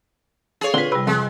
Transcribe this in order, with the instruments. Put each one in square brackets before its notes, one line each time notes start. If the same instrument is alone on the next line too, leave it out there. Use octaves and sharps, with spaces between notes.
[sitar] G#4 C#5 [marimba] A4 F5
[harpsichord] A#2 D3 C4 [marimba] F4 B4
[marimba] C3 G3 [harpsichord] B4
[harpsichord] F2 [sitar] G#3